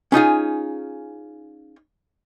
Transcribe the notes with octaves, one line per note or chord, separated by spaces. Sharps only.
C#4 D#4 F4 G#4